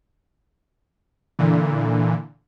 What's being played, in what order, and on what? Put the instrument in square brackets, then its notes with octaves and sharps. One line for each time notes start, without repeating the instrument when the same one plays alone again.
[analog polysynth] A#2 D3 E3